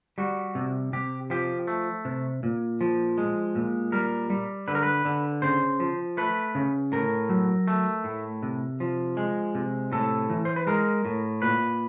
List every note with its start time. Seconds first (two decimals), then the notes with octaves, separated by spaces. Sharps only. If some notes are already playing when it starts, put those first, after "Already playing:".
0.18 G3 F#4
0.55 C3
0.93 C3 G4
1.30 F3 G4
1.67 A3
2.05 C3
2.43 A#2
2.81 F3
3.18 G#3
3.55 A#2
3.92 G3 A#4
4.30 G3
4.68 D3 B4
4.75 A#4
4.83 B4
5.05 D3
5.42 C#3 C5
5.80 F3
6.17 A3 B4
6.55 C#3
6.92 A2 A#4
7.29 F#3
7.68 A3
8.04 A2
8.43 C3
8.80 F3
9.17 G#3
9.55 C3
9.92 A2 A4
10.30 E3
10.45 C5
10.56 B4
10.67 G#3 A#4
11.05 A2
11.42 A#2 B4